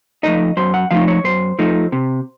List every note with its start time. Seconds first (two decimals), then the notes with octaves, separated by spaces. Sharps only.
0.23 F3 A3 D#4 D#5
0.57 F#2 C5
0.74 F#5
0.91 F3 A3 D#4 F5
1.08 C#5
1.24 F#2 C5
1.59 F3 A3 D#4
1.92 C3